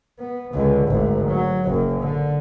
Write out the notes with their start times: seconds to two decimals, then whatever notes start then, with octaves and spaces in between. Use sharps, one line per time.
0.19 B3
0.53 C#2 D3
0.88 G#1 D2
1.28 F#3
1.65 F#1 F#2
2.01 D3